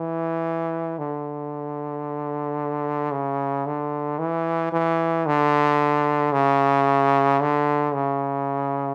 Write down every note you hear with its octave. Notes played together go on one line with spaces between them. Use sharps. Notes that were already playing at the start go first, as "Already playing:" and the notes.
Already playing: E3
D3
C#3
D3
E3
E3
D3
C#3
D3
C#3